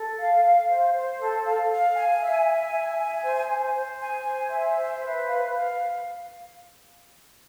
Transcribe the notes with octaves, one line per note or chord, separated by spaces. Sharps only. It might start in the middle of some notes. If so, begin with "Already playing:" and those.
Already playing: A4
F5
F5
C5
C5
A4
F5
F5
G#5
E5
G#5
E5
G#5
C5
C5
C5
G#5
C5
E5
C5
B4
F5
F5